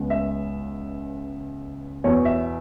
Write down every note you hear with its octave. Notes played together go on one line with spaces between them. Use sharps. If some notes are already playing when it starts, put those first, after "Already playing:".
Already playing: C#2 C#3 G#3 B3
E5
E2 B2 B3 C#5
E5